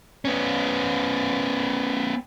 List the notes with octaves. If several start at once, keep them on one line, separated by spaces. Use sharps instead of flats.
B3 C#4